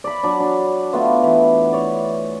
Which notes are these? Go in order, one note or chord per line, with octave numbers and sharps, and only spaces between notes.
D5 B5
F#3 D4
D4
A3 B3 F4
E3
C#5 D5